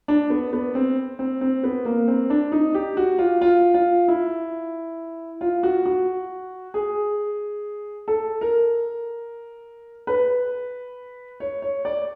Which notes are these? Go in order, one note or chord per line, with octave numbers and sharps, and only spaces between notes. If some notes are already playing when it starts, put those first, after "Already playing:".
D4
B3
B3
C4
C4
C4
B3
A#3
C4
D4
D#4
G4
F#4
F4
F4
F4
E4
F4
F#4
F#4
G#4
A4
A#4
B4
C#5
C#5
D5